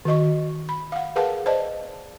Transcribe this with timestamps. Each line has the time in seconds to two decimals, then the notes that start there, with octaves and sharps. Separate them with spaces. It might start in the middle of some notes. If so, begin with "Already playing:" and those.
0.05 D#3 F#4 D#5 C#6
0.69 B5
0.92 F5 F#5
1.16 G#4 A#4 B4 F5 F#5 A5
1.46 C5 D5 D#5 A5